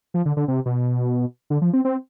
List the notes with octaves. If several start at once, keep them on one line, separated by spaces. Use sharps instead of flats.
F3
D3
D3
C3
B2
D3
F3
C4
C4